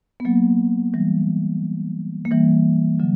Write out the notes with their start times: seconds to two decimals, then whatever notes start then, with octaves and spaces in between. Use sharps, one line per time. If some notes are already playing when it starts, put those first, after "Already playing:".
0.20 B3
0.25 F#3 A#3
0.94 E3 G3
2.25 A#3
2.31 E3 G3
3.00 D3 F#3